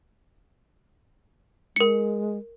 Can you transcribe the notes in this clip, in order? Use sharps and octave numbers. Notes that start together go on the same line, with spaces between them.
G#3 A#4 C#7